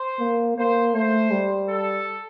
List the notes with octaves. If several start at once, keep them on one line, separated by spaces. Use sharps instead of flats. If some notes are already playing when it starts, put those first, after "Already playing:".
Already playing: C5
A#3
A#3 C5
A3 C5
G3
A4